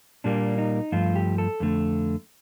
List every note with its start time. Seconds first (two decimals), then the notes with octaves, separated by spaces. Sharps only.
0.24 A#2 G3 A#3 D4
0.58 D#4
0.92 G2 F3 A3 F4
1.16 G4
1.38 A4
1.60 F2 D3 A3